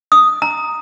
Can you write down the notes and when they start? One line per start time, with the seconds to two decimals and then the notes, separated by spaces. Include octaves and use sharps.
0.12 D#6
0.42 A#5